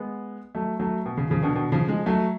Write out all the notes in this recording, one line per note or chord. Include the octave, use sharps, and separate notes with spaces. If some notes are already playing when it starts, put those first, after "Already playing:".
Already playing: G#3 B3
F#3 A3
F#3 A3
B2
C#3
C#3 F3
B2 D3
B2 D3
C#3 F3
F3 G#3
F#3 A3